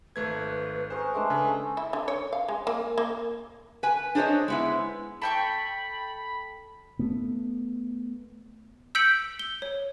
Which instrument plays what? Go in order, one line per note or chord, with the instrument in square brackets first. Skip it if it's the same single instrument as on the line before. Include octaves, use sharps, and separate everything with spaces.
[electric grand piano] G#1 A3 G#6 [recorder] B4
[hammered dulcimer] G#4 A#4 C#6 [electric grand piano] C5
[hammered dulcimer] G#3 A3 D4
[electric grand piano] C#3
[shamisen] E4
D3
C#5
F5
G#3
A#3
A#3
[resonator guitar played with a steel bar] B4 G#5
D4 G#4 C5 C#5 D#5
G#3 B3 E4
[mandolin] A4 G5 C#6 [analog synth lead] B5
[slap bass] A3 B3
[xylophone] E6 G6 B6 C#7 D7 F#7
G7
C#5